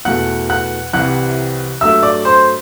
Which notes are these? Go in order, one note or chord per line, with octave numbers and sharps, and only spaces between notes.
E2 B2 A3 F#5 F#6
F#5 F#6
C2 C3 E3 G3 F#5 F#6
G2 F#3 A3 E5 E6
D5 D6
C5 C6